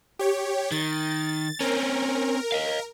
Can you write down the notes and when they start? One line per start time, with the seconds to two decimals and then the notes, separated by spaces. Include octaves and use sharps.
0.19 G4 C#5
0.72 D#3 A6
1.60 C4 C#4 A#4
2.52 D#5 F5